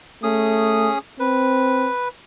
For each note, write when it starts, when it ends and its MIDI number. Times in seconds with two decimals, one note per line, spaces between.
0.23 0.90 57
0.23 0.98 61
0.23 0.98 68
0.23 0.98 87
1.20 1.88 60
1.20 2.08 71